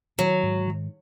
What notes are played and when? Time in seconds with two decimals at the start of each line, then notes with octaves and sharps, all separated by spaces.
0.18 D#3 F#3
0.43 G#2
0.67 D#3